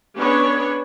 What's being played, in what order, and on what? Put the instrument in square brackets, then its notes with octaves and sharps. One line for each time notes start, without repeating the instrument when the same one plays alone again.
[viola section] B3 C#4 D4 G#4 B4 C#5